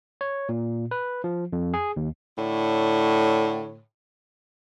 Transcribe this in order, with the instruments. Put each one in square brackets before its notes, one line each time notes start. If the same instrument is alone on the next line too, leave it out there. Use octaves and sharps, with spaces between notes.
[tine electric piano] C#5
A#2
B4
F3
F2
G#4
D#2
[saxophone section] A2 D3 C#5